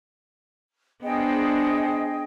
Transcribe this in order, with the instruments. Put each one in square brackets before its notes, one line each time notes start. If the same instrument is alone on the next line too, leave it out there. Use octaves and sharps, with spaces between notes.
[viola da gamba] B3 D4 C5 [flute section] G#4 D#5 G5